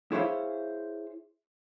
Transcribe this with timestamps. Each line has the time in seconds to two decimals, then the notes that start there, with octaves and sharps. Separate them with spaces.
0.12 E4 G#4 C5 C#5 E5 F5